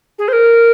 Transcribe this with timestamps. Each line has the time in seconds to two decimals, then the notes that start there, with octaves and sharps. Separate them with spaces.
0.18 G#4
0.28 C5
0.32 A#4